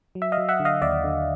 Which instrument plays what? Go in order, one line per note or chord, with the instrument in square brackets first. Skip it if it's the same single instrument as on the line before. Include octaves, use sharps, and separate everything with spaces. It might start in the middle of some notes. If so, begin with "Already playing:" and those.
[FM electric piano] F#3
E5
D#5 F5
F#3
E5 F#5
D3
D#5 F5
D#2 D5 E5
D3